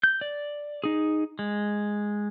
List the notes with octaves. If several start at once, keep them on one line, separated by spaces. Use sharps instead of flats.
G6
D5
D#4 G#4
G#3